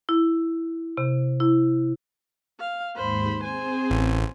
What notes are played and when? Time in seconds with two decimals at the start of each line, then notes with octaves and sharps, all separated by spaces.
0.09 E4
0.97 C3
1.40 E4
2.59 F5
2.96 D#2 G#2 C5 B5 C6
3.43 C4 G#4 C5 G#5
3.90 A1